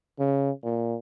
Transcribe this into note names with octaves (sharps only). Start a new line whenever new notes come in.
C#3
A#2